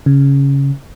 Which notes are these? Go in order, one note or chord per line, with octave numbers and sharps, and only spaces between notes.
C#3